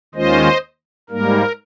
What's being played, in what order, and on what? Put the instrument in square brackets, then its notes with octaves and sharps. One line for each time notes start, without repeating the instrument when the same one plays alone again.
[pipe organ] D#2 D#3 G#3 C#4 F4 C5 D#5
G#2 G3 A#3 A#4